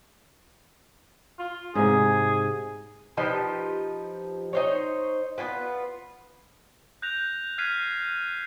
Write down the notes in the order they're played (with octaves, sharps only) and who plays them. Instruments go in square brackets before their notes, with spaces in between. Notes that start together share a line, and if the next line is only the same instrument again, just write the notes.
[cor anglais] F4
[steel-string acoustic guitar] G#2 C3 [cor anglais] G#4
[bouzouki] F3 D#4 G4 B4
D#4 C5 C#5
B3 C4 F4 B4
[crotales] F#6 G6 A#6 F7
F6 F#6 G#6 B6 C7 D#7